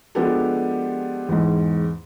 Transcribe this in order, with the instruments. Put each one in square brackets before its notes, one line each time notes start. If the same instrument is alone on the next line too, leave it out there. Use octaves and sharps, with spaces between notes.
[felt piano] F3 G#3 B3 D4 G4 A4
E2 G#2